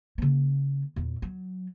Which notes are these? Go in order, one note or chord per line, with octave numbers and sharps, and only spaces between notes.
C#3 A#3
E2 A#2
F#3